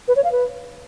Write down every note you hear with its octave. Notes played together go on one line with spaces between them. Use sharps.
B4
C#5
F5
B4